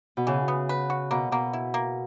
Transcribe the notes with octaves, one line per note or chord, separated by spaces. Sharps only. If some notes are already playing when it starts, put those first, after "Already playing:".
B2
C#3 E3
B3
B4
F#4
B2 A#3
B2 A#3
E4
A#3